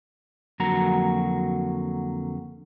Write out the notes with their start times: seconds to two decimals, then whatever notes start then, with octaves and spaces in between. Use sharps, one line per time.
0.60 F2 D3 F#3 A#3 F#4 A#5